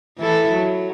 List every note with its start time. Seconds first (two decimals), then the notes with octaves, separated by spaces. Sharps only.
0.18 E3 E4 A4
0.51 F#3